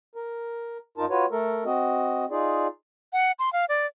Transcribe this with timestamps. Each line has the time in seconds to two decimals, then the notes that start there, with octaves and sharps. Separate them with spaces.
0.15 A#4
0.98 G2 D#4 F4 A#4 A5
1.10 F4 F#4 B4 C#5
1.32 A3 A4 A#4
1.65 C4 F#4 D#5
2.31 D#4 F4 G#4 D5
3.13 F#5
3.39 C6
3.53 F5
3.69 D5